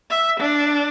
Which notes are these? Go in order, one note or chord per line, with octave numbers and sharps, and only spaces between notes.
E5
D4